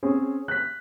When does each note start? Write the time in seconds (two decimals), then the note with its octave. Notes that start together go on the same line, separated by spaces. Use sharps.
0.03 C4 C#4 G#4
0.48 F#6 B6